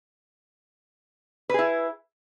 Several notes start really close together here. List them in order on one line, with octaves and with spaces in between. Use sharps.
B4 G#4 E4